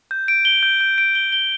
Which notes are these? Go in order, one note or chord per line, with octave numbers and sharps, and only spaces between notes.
G6
D7
G7
G6
G6
D7
G7
G7